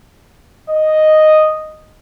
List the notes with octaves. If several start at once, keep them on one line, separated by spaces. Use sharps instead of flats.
D#5